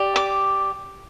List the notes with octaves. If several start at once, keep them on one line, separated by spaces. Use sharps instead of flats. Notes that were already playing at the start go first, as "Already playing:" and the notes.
Already playing: G4 D5
D6